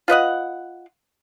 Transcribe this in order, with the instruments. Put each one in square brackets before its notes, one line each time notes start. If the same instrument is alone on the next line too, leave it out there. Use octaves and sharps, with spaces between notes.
[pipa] F4 B4 D#5 F#5